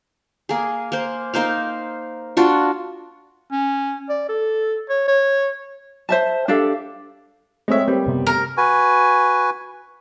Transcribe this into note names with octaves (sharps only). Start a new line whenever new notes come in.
A#3 G#4
A#3 C5
A#3 D#4 C5 F5
D4 F4 F#4
C#4
D5
A4
C#5
C#5
C5 E5 A5
D4 G4 A4 F5
G#3 A3 C4 C#5 E5
G3 A#3 C4 B4
F#1 C3 B3
A#4
F#4 B4 G#5